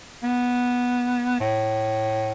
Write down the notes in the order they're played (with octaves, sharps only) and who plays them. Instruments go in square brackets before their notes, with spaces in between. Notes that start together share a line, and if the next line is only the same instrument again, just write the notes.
[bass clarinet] B3
A2